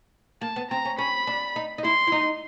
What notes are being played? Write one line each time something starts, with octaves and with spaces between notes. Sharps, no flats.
A#3 A5
B3
C4 A#5
C#4
C#4 B5
D4
D#4
D#4
E4 C6
E4
D#4